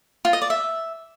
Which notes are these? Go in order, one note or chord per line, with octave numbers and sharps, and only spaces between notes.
F4
D#5
D5
E5